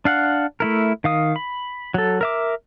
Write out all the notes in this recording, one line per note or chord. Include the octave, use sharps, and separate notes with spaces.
D4 F5 F#5
A3 E4 A#4
D#3 F5 D#6
B5
F#3 A4
A#4 E5 D6